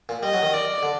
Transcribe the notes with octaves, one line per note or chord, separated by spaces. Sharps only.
A#2
G3 D#5
F#3
D#3
D5
D3